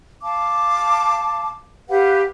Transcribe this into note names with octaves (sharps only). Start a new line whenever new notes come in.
F5 A5 D6
G4 B4 F5 F#5